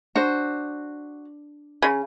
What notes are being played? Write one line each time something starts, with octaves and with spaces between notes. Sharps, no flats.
D4 F#4 C5
C#3